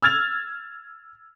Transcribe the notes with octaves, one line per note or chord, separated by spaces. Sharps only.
E6 F6 G#6 A6 F7